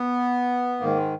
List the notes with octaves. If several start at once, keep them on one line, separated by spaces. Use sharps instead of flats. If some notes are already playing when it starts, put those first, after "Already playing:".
Already playing: B3
G#2 D#3 A#3
G#3